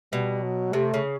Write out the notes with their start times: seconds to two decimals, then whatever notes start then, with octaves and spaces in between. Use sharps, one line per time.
0.13 B2 G3
0.43 F#3
0.73 C3 A3
0.94 C#3